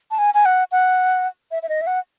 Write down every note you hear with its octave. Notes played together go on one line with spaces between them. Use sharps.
A5
G#5
G#5
F#5
F#5
E5
E5
D#5
E5
F#5